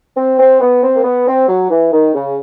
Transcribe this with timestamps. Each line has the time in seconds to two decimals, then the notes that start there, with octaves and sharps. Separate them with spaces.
0.17 C4
0.39 C4
0.61 B3
0.83 C4
0.96 A#3
1.04 B3
1.27 C4
1.48 F#3
1.71 E3
1.92 D#3
2.14 C#3